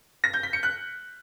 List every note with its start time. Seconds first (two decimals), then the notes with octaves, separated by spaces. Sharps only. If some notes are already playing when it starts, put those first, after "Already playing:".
0.24 A#6
0.34 G6
0.43 B6
0.53 C#7
0.63 F#6